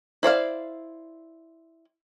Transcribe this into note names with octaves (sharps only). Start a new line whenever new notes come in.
E4 C5 D5 F5